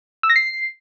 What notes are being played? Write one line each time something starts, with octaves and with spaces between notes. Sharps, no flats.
E6
A#6
C7